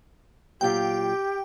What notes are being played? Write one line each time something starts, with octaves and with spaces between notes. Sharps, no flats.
A#2 F#3 F4 G4 G5